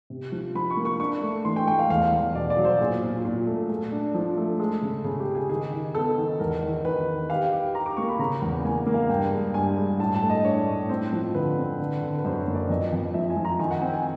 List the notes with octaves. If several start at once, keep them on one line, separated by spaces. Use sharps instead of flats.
C3
F3
F3 B5
C#6
A#3
C#6
D4 C#6
A3
E3 C6
G5
A3 G5
F5
E2 F5
E2
B2 D5
D5
F#3
C5
A#2 G#4
A#2
A#2
A3
A3 G#4
D4
F3
A3
G#3 A4
C#3
C#3 G#4
G4
C#3
G#4
D#3 G#4
D#3
B3 A4
D#3
E2 A#4
D#3
D#3 B4
D#3
G4 F5
G4
G4 A#5
D6
A#3 C#6
B5
C#3 A#5
E2
A#3 G#5
A#3
F5
G2 G5
G#3
G2 G#5
G#3
A2 A5
A5
A3
D#5
D4 C#5
A2
C4 C5
F3
D3 B4
C4
D3
D3
B4
F#2 C5
C#5
A#3
D5
F2 D#5
F2
F3 E5
G#5
F3
A#5
D#3 G#5
F#5
C4 G5
G#5